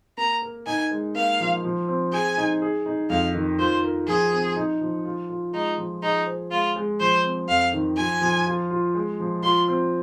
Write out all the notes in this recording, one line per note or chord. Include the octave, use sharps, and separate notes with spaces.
A#3 A#5
A#4
D#4 G#5
G#3
A#3 F5
F3
F3
C4
G#4 G#5
D#4
G#4
D#4
F2 F5
D#3
F4 C5
A#4
F3 G#4
C4
D#4
F3
F4
F4
G#3 D#4
F3
D#4 G#4
C5
G#3 F4
G#3
F3 C5
C4
F2 F5
D#3
F3 G#5
F3
F4
F4
G#3
F3
F4 C6
C4